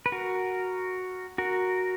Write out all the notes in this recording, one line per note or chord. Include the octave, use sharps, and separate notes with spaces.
B4
F#4 A#4
F#4 A#4